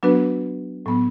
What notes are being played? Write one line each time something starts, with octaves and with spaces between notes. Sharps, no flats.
F#3 B3 D4 F#4 B4
A2 F#3 B3